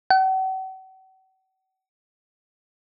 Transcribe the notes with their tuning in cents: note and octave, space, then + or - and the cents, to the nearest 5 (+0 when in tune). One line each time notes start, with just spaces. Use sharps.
F#5 +45